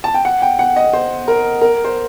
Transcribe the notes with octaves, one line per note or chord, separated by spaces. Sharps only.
A5
G5
F#5
G5
F#5
D#5
C5
A#4
A#4
C5